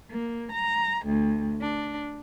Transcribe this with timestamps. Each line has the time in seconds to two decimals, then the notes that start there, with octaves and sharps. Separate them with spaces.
0.11 A#3
0.52 A#5
1.06 D2
1.62 D4